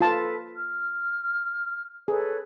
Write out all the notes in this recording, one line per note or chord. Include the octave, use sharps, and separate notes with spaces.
F4 A4 B4 A5
F6
G#4 A4 B4 C#5